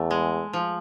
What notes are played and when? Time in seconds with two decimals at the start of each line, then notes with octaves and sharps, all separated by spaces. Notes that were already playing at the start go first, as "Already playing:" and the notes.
Already playing: E2 A3
0.11 G#3
0.53 F3